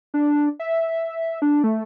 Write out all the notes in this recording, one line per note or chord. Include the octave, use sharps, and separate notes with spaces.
D4
E5
D4
A3